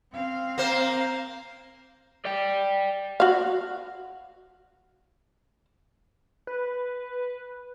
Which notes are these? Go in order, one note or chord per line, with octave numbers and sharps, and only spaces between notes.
C4 F5
A#3 C5
D5 G5
F#4 F5
B4